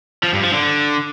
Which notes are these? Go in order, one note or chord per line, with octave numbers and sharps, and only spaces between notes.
F3
G2
F3
D3